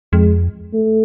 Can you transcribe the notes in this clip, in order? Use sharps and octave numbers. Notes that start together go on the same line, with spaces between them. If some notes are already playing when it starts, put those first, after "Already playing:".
F2 G#3
A3